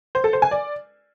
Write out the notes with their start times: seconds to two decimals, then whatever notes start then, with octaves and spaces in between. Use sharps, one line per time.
0.15 C5
0.24 A4
0.33 C5
0.42 G#5
0.51 D5